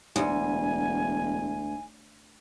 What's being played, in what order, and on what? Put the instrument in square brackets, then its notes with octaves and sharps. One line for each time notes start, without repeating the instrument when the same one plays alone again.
[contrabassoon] E1 [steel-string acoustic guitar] D2 [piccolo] G#5